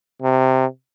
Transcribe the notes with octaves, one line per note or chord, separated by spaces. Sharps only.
C3